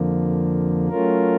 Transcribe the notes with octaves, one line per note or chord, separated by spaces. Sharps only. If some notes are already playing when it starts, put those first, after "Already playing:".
Already playing: F2 D3 F3 A#3
F#3 A3 C#4 F4 A#4